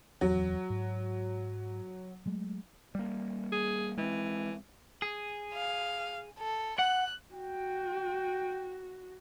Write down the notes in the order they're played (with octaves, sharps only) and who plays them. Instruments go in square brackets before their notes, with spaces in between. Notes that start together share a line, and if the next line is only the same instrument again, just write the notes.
[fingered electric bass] D1 E2 C4 [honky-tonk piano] F#3
[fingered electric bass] G#2
F#3 G#3 A3
[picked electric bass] G3 A#3
[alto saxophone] G#4
[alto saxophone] E3 [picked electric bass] G#3 C4
[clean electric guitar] G#4
[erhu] F5
A4
[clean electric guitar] F#5 [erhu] F#6
[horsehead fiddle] F#4 [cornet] G5